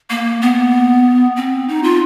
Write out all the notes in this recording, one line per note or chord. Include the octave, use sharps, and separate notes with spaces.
A#3
B3
C4
D#4
F4